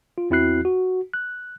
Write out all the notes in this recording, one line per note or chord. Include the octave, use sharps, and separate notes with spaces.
F4
E2 C4 E4 F#4 F#6 C7
F#4
F#6